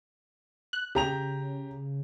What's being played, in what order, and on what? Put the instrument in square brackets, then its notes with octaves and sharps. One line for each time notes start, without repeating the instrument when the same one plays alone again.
[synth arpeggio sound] F#6
[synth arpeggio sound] C#3 [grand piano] G4 A#5 F7